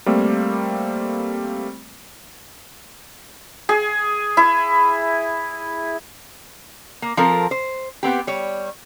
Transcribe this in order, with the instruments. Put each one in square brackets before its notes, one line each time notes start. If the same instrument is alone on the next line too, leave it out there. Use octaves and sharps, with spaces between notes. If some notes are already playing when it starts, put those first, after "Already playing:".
[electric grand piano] G3 A3 A#3 C4
[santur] G#4
E4
[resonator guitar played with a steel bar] A#3
F3 C4 F4 A4 A#4
C5
B3 C4 G4
G3 C#5